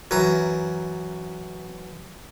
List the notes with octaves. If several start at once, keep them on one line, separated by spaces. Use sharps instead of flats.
F#2 E3 A#5